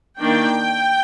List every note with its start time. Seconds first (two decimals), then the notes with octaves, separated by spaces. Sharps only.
0.19 D#3 A#3 D4 G5